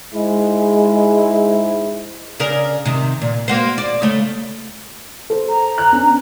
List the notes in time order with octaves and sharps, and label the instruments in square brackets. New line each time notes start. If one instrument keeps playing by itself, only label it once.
[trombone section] G#2 E4 [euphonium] G#3
[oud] C#3 D4 A#4
C3 D#3
A#2
A#3 F#4 C5
D5
C#3 A3
[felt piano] A4 C5
[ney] A#5
[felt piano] F#6
B3 C#4 D4